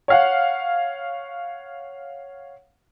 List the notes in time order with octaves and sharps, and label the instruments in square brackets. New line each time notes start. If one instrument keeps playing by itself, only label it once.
[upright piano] C#5 F5 F#5